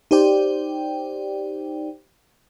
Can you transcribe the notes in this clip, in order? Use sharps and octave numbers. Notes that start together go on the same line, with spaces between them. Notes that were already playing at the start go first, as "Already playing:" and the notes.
D#4 G4 C5 D5 G5